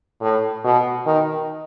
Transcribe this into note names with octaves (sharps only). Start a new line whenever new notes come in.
A2
B2
D#3